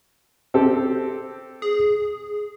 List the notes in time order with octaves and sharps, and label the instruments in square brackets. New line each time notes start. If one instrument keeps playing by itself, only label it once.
[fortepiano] C4 G4 A4
[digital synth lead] G#4